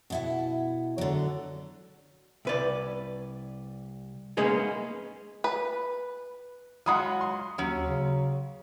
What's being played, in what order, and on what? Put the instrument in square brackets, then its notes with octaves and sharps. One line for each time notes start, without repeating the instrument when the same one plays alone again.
[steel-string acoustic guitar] B2 E4 F#5
D3 F#3
[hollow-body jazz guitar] C2 B4 D5
G#3 A#3 B3 C#4 D#4 G#4
[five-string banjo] B4
[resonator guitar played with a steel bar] F#3 G#3 F4 [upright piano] F#5 B5 D#6
[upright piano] C6
[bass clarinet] D#2 [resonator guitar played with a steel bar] F#3 C#4
[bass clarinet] C#3